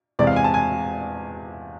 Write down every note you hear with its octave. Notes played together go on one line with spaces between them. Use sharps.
E2 C3 G#3 D5
F5
G#5
A5
G#5